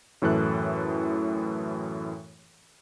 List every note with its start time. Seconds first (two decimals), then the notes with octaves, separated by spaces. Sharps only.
0.22 F#2 A2 E3 A4 F#6